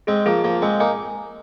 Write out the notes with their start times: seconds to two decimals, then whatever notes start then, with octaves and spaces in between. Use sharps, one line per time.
0.07 G#3 C4 G#4
0.26 F3 A#3 G#4
0.44 F3 A#3 F5
0.62 G#3 C4 G#5
0.80 A#3 D#4 G#5